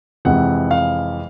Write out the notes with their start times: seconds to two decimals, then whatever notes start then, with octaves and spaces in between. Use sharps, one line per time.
0.25 F2 C3 E3 G#3 F#5
0.71 F5